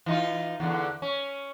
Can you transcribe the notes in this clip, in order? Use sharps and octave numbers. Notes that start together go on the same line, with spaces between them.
E3 D#4 F4
E2 D3
C#4